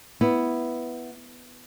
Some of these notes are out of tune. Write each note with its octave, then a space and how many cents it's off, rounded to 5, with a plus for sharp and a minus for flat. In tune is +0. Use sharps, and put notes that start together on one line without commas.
B3 +0 E4 +0